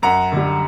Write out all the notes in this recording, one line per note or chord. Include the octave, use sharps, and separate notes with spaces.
F#2 F#5 A#5
D3 G3